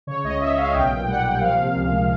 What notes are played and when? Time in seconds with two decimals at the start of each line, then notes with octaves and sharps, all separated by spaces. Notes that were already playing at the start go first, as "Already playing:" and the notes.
0.07 C#3 C#5
0.24 C#2 D#5
0.41 C#2 E5
0.58 C#3 F5
0.74 B1 G5
0.91 A#2
1.07 G3 F#5
1.24 A#2
1.41 F3 F5
1.58 C3
1.76 C#2
1.91 G#3